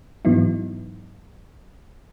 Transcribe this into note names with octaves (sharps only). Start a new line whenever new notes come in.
G#2 E3 F#3 B3 D#4 E4